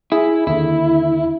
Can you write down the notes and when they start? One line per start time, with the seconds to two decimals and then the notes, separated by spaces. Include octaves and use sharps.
0.12 E4 G#4
0.47 D#2 D3 E4